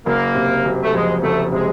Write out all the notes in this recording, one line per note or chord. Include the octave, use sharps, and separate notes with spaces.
F#1 A#3
C3
F#1
A3
F2 G#3
F#1 A3
C3 G#3